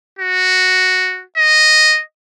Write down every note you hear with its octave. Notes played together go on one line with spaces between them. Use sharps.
F#4
D#5